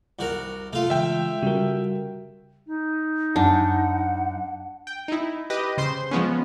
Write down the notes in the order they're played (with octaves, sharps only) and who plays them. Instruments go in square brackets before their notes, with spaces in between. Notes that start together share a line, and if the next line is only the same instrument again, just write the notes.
[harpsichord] C2 F#4 A#4
[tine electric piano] C3 [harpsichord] A3 F4
[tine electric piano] C#3 E3 G#3 [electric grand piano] E5 G5
[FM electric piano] C#3 G3 [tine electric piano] F#4 A#4
[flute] D#4
[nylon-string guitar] F#2 [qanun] D4 [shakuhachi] F#5
[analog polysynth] G5
D#4 E4
G4 B4 D#5
C#3 C5 C6
F3 G#3 B3 C#4